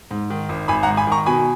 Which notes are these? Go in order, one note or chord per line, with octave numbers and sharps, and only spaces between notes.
G#2
D#3
G#1
G#1 G#5 B5
F#5 A#5
G#2
G#5 B5
D#3 A#5 C#6
B2 G#5 B5